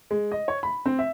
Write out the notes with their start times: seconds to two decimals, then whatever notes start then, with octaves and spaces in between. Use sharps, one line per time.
0.11 G#3
0.32 D#5
0.48 C#5
0.63 B5
0.86 C4
0.99 E5